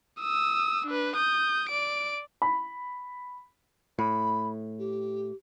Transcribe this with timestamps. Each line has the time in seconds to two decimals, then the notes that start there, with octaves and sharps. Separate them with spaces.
0.21 D#6 E6
0.86 D4 B4
1.17 D#6 G6
1.69 D5 D7
2.42 B5
3.99 A2 B5
4.78 G4